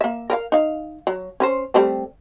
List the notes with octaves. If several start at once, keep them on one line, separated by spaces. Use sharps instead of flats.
A#3 E5
A#4 B4 F5
D#4 F5
F#3
C#4 B4 C5
G3 A3 C4